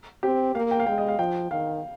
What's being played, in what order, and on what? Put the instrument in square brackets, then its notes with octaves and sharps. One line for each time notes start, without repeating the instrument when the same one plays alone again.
[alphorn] C4 [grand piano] G4
[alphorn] A#3 [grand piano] F5
[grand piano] G5
F5
[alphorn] G#3 [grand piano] G5
[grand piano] D#5
F5
[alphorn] F3 [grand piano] G5
[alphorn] D#3 [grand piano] F5